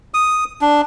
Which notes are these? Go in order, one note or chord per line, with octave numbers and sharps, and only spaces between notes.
D#6
D4